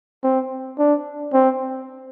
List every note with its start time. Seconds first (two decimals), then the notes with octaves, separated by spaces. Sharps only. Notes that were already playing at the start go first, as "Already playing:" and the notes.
0.24 C4
0.78 D4
1.33 C4